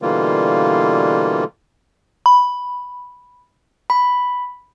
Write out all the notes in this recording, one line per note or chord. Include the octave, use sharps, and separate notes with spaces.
B2 D3 E3 G3 A#3 F4
B5
B5